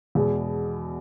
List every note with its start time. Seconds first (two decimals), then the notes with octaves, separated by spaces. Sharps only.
0.15 E2 B2 G#3